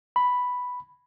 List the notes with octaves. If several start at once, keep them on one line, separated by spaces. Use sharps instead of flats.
B5